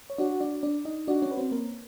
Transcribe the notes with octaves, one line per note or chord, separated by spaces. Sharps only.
C#5
D4 F#4 D5
D4 D5
D4 D5
D#4 D#5
D4 F#4 D5
C#4 C#5
B4
C4 C5
A#3 A#4